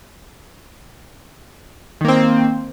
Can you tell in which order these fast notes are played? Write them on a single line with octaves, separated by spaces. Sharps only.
D#3 A#3 C4